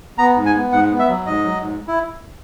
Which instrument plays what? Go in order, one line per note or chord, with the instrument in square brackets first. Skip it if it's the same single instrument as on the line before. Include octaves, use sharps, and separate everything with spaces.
[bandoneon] B3 A#5
G#2
G#5
B3
G#2 F#5
B3
E5
F#3
G#2 D#5
F#3
G#2
E4